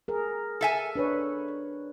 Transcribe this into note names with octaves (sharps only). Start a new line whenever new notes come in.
G#4 A#4
A4 E5 G#5
D4 B4 C#5